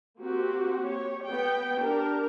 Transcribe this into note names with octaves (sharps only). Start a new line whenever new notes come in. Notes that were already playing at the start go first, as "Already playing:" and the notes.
A#3 C4 F#4 G4
G4 C#5
B3 G5
D4 G4 A#4